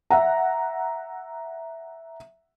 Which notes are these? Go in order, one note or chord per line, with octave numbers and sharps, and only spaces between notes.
E5 F#5 A#5